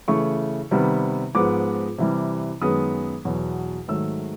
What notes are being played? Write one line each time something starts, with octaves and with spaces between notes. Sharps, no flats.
C#3 E3 A3 C#6
C3 D#3 G3 B3
G#2 F3 G#3 B3 D6
C3 E3 G3
F#2 D#3 G#3 B3 D#6
E2 B2 F#3
G#2 D#3 F#3 A3 E6